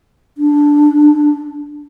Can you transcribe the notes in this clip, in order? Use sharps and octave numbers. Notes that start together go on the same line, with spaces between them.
D4